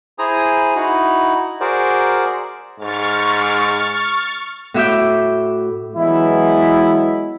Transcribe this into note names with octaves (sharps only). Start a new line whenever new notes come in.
E4 G#4 C5 G#5 A#5 D#6
D#4 E4 F#4
F#4 G#4 A#4 C5 D5
G#2 C#6 F6 A6
A2 F#4 E5 D6 G6
E3 F#3 G#3 B3 E4